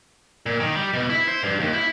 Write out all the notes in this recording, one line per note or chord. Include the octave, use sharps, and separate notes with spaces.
A#2
D#3
G3
B2
E4
C5
G2
D#2
E4